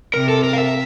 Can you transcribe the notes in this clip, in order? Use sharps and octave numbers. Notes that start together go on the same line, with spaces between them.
C3 A#4
A4
A#4
F5
E5